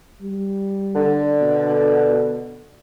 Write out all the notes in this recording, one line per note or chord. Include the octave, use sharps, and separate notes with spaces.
G3
D3
B2